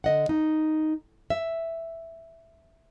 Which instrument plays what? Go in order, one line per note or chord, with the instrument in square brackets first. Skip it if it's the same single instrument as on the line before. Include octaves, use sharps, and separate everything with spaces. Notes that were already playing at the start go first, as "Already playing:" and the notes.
[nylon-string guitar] D3 D#5 F#5
D#4
E5